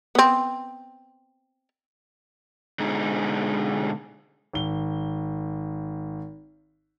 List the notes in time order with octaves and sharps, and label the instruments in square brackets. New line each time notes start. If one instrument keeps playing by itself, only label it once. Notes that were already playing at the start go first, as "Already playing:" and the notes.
[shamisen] B3 C4
[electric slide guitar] B2 D3 G#3 D#4
[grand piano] G#1 G7